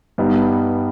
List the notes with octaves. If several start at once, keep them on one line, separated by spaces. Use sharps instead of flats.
G2 G3 B3 D#4